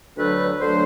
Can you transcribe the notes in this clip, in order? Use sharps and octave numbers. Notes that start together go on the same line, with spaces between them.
D2 D3 F#3 A3 B4
D2 D3 F#3 A3 C5